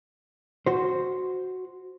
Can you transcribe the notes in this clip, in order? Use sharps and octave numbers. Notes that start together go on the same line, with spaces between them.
F#4 C5